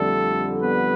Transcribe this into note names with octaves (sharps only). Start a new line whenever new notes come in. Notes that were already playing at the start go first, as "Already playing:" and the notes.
Already playing: F2 D3 G3 A3 A4
B3 B4